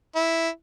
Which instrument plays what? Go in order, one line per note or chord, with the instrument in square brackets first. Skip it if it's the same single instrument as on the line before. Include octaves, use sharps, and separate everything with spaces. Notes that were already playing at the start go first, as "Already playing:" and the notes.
[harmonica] E4